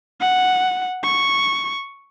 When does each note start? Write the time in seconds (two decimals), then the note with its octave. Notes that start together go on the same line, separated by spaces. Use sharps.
0.21 F#5
1.04 C#6